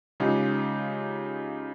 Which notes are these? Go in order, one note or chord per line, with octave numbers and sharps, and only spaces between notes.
C#3 G#3 D#4 F4 G4